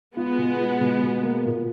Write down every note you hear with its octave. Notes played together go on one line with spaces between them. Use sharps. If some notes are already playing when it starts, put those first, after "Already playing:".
G#3 B3 F4
B2
F4
B2
B2
A#3
A#2